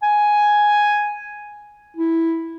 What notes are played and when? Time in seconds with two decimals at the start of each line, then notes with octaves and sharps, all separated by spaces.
0.03 G#5
1.97 E4